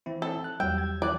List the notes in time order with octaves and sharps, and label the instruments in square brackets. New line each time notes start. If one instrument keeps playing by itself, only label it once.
[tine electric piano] E3 C4 E4
[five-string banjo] A4
[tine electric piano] F#6
[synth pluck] E2 F#3 G3 [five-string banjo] G5 [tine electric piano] E6
[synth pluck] G#6
[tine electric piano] E3 E4 F#6 [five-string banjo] D5